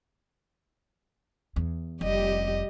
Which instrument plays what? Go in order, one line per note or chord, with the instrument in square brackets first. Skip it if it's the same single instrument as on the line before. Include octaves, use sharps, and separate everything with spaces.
[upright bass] E2
[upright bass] F1 [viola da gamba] G3 G4 D#5